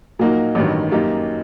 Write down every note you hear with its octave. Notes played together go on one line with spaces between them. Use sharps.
A#2 F#3 A#3 D#4 F#4
A1 G2 D#3 F#3
F#2 F#3 A#3 D#4 G4